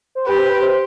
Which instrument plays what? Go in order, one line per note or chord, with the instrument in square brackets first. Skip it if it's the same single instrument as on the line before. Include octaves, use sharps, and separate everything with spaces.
[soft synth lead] C5
[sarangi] G4 [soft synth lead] B4
[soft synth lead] C5
B4
C5